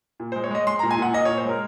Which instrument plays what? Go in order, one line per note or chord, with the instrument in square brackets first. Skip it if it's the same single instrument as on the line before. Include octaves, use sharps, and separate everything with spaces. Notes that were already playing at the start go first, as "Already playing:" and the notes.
[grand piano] A#2
G#3 C5
C#5
G#3 D#5
G#3 C6
A#2 A#5
G#5
A#2 F#5
A#2 D#5
A#2 C#5
C5
G#3 A#4